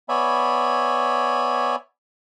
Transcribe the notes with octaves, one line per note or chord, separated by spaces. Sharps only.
B3 C#5 D5 E5 G#5 B5